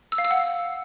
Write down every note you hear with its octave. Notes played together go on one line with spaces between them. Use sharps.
E6
F5
E6
F#5